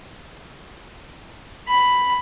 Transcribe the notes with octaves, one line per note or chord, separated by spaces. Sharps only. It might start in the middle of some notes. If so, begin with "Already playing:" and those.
B5